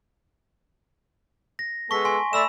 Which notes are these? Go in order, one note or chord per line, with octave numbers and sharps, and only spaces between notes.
A#6
G#3 B3 A4 C#6 B6
G#5 C6
A3 D5 E5 B5 E6 E7